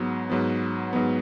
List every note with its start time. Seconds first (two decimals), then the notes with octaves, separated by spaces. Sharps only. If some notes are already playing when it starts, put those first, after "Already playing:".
Already playing: G#2 F#3 B3
0.30 G#2 F#3 B3
0.93 G#2 F#3 B3